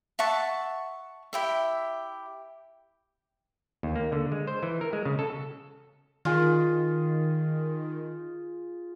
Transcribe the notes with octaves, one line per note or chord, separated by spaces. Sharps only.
E5 F#5 A5 C#6
E4 G4 E5
D#2
A#3
D3
G#3
C5
E3
A#4
G#3
C#3
A4
D#3 F4 G#4